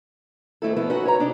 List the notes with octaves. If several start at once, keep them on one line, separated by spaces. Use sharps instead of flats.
G#2 D#3 A3 E4 A4
F3 A3 B3 E4
F#2 C#4 D#4 F#4 B4 F#5
C#5 A#5
C3 D4 D#4